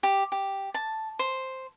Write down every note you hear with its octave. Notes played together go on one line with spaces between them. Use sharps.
G4
G4
A5
C5